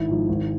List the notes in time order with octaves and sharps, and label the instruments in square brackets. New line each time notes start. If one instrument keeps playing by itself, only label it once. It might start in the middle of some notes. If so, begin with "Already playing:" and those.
Already playing: [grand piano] G#1 E4
G#2 F3
G#1